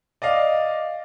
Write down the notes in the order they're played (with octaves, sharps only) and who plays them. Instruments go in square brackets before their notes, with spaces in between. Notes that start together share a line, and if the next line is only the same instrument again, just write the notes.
[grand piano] D5 D#5 F5